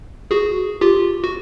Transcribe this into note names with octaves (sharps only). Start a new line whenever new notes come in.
F#4 G#4
F4 G4
F#4